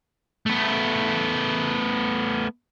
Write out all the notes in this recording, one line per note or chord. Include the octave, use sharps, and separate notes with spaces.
A3 B3